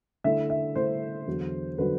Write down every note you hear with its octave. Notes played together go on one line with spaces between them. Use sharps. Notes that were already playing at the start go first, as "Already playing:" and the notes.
D3 A3 E4 E5
E5
D3 A3 E4 C5
E2 D3 F#3
D3 F#3 B4